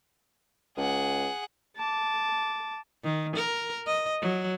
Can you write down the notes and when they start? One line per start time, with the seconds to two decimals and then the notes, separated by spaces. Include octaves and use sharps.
0.77 C#2 G#4 F#5
1.77 A5 D6
3.04 D#3
3.36 A#4
3.87 D#5
4.21 F#3